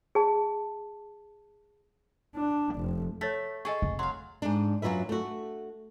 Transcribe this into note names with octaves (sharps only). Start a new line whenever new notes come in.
G#4 A5
D4
F1
A3 C#5 A6 B6
G#4 A4 D#5 G#5 C#6
F1
F#3 F5 C6
G#2 D4
F#2 F#3 F4 B4 E5
A3 F#4